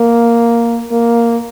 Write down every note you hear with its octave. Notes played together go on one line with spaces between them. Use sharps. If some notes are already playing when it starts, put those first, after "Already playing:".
Already playing: A#3
A#3